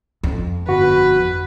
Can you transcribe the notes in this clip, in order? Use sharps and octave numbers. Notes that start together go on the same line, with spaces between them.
F2
G1 F#4 B4